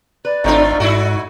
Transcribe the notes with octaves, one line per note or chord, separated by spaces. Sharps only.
B4 D5
G#1 A2 A3 C4 D4 D#4 F4
G#2 A3 D#4 E4 F#4